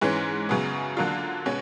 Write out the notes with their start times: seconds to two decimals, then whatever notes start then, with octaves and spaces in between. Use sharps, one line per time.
0.01 G#2 E3 G#3 C#4
0.49 F#2 C#3 F#3 B3
0.97 D3 F#3 A#3 D4 F4
1.46 B2 G#3 C#4